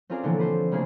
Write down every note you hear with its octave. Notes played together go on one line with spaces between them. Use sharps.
C4 C#4 F4 G#4 A#4 D5
B2 D3 E3 F3 A#3 A4
B4 C5
C#3 F3 A3 A#3 C4 G#4